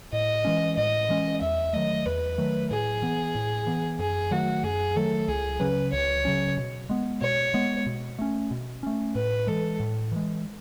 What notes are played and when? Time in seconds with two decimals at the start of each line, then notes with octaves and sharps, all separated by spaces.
0.13 A2 D#5
0.45 E3 G#3 C#4
0.77 A2 D#5
1.09 E3 G#3 C#4
1.41 E2 E5
1.73 D#3 F#3 A3 D#5
2.06 E2 B4
2.38 D#3 F#3 A3
2.70 A2 G#4
3.02 E3 B3
3.35 A2
3.67 E3 B3
3.99 F#2 G#4
4.31 D#3 F#3 A3 F#4
4.64 F#2 G#4
4.96 D#3 F#3 A3 A4
5.28 C#2 G#4
5.60 C#3 F#3 C#4 B4
5.92 C#2 C#5
6.25 C#3 F#3 C#4
6.57 B2
6.89 G#3 B3
7.21 B2 C#5
7.54 G#3 B3
7.86 B2
8.19 A3 C#4
8.51 B2
8.83 A3 C#4
9.15 A2 B4
9.47 E3 G#3 A4
9.80 A2
10.12 E3 G#3